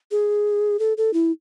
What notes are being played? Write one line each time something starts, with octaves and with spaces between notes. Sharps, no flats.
G#4
A4
A4
E4